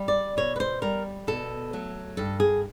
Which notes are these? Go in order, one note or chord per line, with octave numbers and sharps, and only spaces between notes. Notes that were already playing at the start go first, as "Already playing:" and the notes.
Already playing: G3
D5
B2 C#5
B4
C5
G3 A#4
B2 A4
F#3 A3
G2 A4
G#4